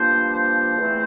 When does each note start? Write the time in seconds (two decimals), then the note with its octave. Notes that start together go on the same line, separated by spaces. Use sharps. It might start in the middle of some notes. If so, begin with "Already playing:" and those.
Already playing: G2 F3 A#3 C5
0.33 C5
0.77 E2 E3 A3 C4